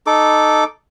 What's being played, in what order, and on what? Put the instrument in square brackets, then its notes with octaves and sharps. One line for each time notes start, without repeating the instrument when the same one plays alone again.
[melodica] D#4 A4 D6